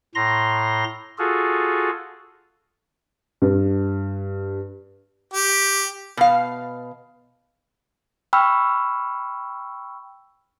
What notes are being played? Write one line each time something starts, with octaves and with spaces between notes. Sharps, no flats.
A2 A#5 C6 A#6
F4 F#4 G#4 A4
G2
G4
B2 F5
G5 B5 C#6 E6 F6